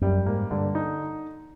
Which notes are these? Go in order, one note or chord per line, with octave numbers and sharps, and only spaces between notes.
F#2 G3
G#2 A#3
G2 D3
D#4